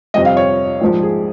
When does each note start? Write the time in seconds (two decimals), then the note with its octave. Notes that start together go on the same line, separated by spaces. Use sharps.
0.14 G1 F2 C3 D#5
0.25 F5
0.37 C#5
0.81 A#1 G#2 F3
1.03 G#4